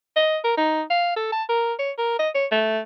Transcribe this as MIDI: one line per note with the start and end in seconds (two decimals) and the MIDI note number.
0.16 0.38 75
0.44 0.55 70
0.57 0.82 63
0.90 1.12 77
1.16 1.27 69
1.32 1.43 81
1.49 1.73 70
1.79 1.92 73
1.98 2.18 70
2.19 2.29 75
2.35 2.46 73
2.51 2.80 57